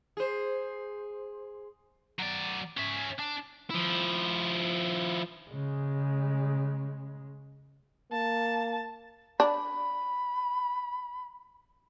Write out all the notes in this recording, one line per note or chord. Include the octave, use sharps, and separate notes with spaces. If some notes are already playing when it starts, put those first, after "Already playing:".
G#4 C5
F#3 D5
C#4 E5
D4
F3 E4
C#3 G#3
A#3 A5
D4 B5